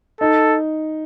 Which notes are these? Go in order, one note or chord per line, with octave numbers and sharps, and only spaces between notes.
D#4 A4